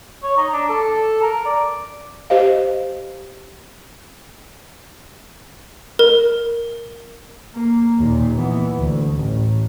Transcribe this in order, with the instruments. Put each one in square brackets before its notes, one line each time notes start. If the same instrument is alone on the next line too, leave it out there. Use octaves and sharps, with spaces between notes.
[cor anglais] C#5
D#4
D4
A4
A#4
D5
[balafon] G4 C5 D#5 F5
[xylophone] A#4
[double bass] A#3
D#2 A#2
E3 B3
D2
A1